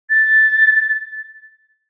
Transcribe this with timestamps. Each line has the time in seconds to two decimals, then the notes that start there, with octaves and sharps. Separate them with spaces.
0.09 A6